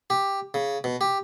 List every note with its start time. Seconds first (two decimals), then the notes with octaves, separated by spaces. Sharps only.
0.10 G4
0.54 C#3
0.84 B2
1.01 G4